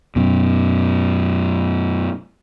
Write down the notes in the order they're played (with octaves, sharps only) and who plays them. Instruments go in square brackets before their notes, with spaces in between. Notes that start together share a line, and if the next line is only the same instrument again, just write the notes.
[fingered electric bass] F#2 B2